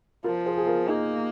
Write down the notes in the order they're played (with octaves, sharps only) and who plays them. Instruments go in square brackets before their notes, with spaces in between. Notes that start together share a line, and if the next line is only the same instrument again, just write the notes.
[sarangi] F3 [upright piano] F4 A#4
[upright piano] G#4 C5
G#4
F4 A#4
[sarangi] A#3 [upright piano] D#4 G#4